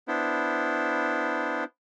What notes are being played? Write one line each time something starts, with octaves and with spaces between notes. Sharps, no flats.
B3 D4 E4 C5